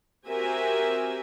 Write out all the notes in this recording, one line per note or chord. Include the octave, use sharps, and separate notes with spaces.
C4 F#4 G4 A#4 E5 G#5